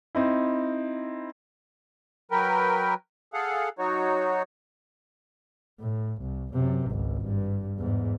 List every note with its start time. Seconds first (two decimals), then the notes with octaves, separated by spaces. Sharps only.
0.15 C4 D#4 E4
2.31 F#3 A#4 B4 G5
3.34 G#4 A4 F5 F#5
3.79 F#3 D#4 F#4 C#5
5.80 A2
6.22 C2
6.53 F#2 C3
6.87 G#1 C#2
7.24 G2
7.77 E2 G#2